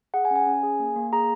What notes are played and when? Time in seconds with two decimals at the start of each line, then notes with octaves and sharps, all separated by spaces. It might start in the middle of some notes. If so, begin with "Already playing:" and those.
0.14 G#4 F#5
0.25 G#5
0.31 C#4
0.36 G#5
0.47 C#4
0.63 G#4
0.79 A#3
0.96 A#3
1.12 G#4 A#5